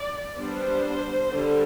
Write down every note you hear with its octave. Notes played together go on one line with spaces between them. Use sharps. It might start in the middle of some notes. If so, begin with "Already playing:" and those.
Already playing: D5
G3 B3 D4 C5
D3 G3